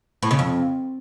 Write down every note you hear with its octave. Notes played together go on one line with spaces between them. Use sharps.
A2
C#3
F2